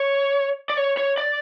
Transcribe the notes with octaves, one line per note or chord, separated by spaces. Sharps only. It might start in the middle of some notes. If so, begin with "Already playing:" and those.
Already playing: C#5
D5
C#5
C#5
D5